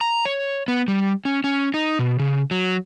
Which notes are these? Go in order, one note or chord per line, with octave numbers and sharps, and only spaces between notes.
A#5
C#5
B3
G3
C#4
C#4
D#4
B2
C#3
F#3